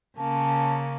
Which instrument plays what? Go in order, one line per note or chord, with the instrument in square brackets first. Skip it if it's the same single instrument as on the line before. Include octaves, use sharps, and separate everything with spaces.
[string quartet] C#3 A#3 C#4 [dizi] A5